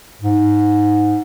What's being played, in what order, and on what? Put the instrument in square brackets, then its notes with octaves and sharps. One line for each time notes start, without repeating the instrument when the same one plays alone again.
[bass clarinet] G#2